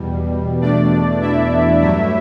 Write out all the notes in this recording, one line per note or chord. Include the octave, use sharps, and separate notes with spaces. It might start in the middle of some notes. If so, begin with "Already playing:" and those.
Already playing: E2 B2 G3
E2 B2 A3 D4 D5
E4 E5
G2 F#3 A3